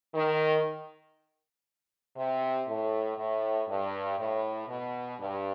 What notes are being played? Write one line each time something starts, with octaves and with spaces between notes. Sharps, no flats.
D#3
C3
A2
A2
G2
A2
B2
G2